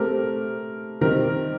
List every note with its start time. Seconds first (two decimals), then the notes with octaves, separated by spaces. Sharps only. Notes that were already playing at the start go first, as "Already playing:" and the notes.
Already playing: A3 C4 G4 A#4
1.01 D#3 G3 C4 G4 A#4